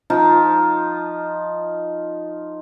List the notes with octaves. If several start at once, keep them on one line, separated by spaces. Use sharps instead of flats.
F3 D#4 F4